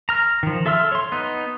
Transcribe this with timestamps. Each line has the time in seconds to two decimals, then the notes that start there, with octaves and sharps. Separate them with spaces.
0.09 A#5 F6
0.43 D#3 F3
0.66 A4 E5 C6 E6 F6
0.92 C#5 C6
1.12 B3 D#4